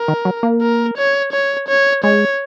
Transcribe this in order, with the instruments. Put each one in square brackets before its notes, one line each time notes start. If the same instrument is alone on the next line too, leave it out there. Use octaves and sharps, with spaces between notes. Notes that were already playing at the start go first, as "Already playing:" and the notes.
Already playing: [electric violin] A#4
[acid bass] D#3
F#3
A#3
[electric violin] A#4
C#5
C#5
C#5
[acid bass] G#3 [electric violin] C#5